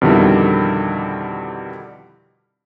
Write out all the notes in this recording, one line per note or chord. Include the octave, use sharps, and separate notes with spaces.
F2 B2 D3 D#3 G3 E4